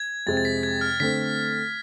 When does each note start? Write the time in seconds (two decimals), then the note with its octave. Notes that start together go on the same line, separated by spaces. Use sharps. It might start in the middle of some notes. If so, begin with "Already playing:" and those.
Already playing: G#6
0.27 F2 C3 G#3 C4 A6
0.37 A6
0.45 B6
0.63 G#6
0.81 F6
1.00 D3 A3 C4 B6